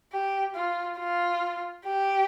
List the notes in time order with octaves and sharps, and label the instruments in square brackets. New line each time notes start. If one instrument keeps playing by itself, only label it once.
[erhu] G4
F4
F4
G4